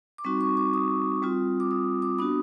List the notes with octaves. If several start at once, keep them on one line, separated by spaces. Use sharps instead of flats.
D6
G3 C4 D#4 F#4 C#6
C#6
D6
D#6
G3 C4 F4
D6
D#6
D6
B3 D4 F#4 D#6